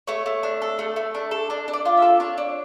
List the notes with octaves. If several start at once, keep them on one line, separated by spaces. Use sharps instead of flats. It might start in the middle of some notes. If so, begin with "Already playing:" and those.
A3 C#5
A3
D4
A4
A3
A3
D4
A4
D4 D5
D4
D5
F4
E5
A4
D4 C#5
D4